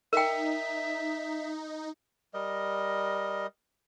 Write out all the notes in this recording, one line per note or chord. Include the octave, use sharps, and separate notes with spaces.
D#4 A#4 E5 G5
G3 A#4 D#5